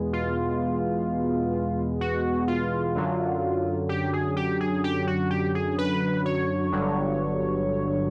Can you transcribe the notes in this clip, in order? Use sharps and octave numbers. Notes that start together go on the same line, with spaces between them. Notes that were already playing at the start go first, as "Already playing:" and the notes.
Already playing: E2 B2 G#3 B3
F4
F#4
F4
F#2 D3 F#3
G4
G#4
G4
G#4
G4
F#4
G4
G#4
B4
C#5
G1 G2 D3 F#3